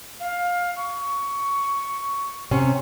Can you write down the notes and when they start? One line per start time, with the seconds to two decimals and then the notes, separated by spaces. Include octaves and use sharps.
0.20 F5
0.76 C#6
2.51 C3 C#4